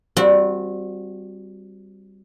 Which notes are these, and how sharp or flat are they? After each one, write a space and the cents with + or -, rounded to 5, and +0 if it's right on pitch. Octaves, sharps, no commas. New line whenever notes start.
G3 +0 C4 +0 F#4 -25